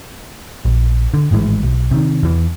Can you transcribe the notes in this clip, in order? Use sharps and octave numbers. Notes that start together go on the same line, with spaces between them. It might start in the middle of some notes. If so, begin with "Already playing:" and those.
A#1
D3
G#1 A2 E3 G#3
B1
C3 D#3
E2 E3